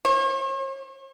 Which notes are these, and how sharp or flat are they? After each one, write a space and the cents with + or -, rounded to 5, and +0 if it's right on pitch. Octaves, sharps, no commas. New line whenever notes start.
C#5 -45